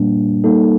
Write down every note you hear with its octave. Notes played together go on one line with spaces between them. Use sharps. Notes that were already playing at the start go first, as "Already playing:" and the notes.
Already playing: A#2 G3 A#3 D4
G3 A#3 D#4 A4